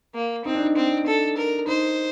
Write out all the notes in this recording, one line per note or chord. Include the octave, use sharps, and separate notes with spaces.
A#3
C4 D#4
D4
D#4
C4
A4
A#4
D#4 C5